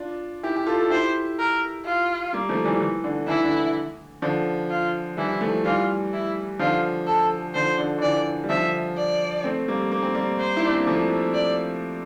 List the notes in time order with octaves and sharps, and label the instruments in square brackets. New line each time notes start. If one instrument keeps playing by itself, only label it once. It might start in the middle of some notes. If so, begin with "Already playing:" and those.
Already playing: [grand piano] D4 F4
E4 G4
G4
F4 A4
A4
[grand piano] E4 G4 [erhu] C5
[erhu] A#4
F4
[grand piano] G3 A#3
F3 A3
E3 G3
E3
D3
[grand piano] E3 [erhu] E4
[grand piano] D3
D3 F3
[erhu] F4
[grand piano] E3 G3 [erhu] E4
[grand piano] F3 A3
[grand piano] E3 G3 [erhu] F4
[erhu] E4
[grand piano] D3 F3 [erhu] F4
[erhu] A4
[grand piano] D3 F3 [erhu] C5
[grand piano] D3
D3
[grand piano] E3 [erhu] D5
[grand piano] G3
[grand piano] D3 F3 [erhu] E5
[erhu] D5
[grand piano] A3 C4
G3 A#3
A#3
C4
G3 A#3
[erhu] C5
[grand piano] E4
D4
C4
A#3
F3 A3
[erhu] D5